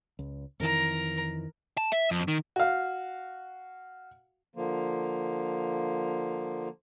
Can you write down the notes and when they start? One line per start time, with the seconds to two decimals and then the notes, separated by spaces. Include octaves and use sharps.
0.19 C#2
0.60 F2 D#3 E3 A#4 A#5
1.77 A5
1.92 E5
2.11 F2
2.28 D#3
2.56 F#4 F5
4.55 D3 F3 A#3